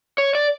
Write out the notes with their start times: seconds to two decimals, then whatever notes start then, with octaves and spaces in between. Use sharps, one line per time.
0.18 C#5
0.35 D5